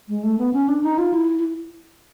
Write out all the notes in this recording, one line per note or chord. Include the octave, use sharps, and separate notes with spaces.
G#3
A3
B3
C#4
D4
D#4
F4
E4
E4